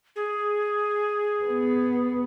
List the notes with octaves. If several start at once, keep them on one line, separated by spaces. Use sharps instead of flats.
G#4
B3